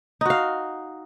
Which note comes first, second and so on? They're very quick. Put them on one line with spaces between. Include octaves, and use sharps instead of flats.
D#4 F#4 F5